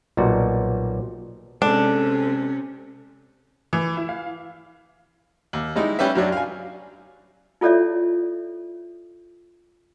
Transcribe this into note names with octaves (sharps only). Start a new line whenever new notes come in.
B1 A#2 G3 F#4
C3 G#3 C#4 D4 A4
E3
E4
F5
D#2
G3 G#3 D#4 E4
G3 C#4 G4 B4 E5
F#2 F#3 D4
F5 G#5
E4 F4 A4 C#5 D5 E5